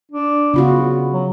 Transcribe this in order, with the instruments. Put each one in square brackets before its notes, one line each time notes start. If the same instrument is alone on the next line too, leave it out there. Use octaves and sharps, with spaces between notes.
[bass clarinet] D4
[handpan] C#3 F4 F#4 [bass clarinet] B3
[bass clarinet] F#3